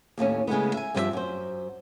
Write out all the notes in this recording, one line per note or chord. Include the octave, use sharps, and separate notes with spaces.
D#2 A2 A3 C#4
C#3 G#3 A3 B3
E5 G#5
G2 F3 G3 E4 G4 E5
F#2 C5